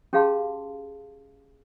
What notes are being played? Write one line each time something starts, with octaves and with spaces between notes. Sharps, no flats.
C#4 G4 G#4 F5 A5 C6